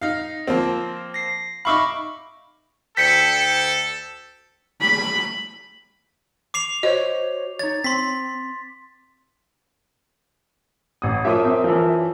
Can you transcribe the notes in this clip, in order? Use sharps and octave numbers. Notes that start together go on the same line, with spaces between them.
D#4 F5
F3 A#3 C4
A#6 C7
D#4 E5 F5 B5 C#6 D6
D2 A4 G5 B6 C#7
B5
D6 C7 F7
F#4 C5 C#5 D#5
D#4 C#5 A6
C4 C6 B6
A1 D#6
F#2 F3 F#3 E5 D6 D#6
C4
E3 F3